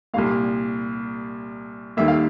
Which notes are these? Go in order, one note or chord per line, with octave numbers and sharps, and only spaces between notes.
C2 A#2 G3 A#3 F5
D#2 D#3 G3 A#3 E5
F5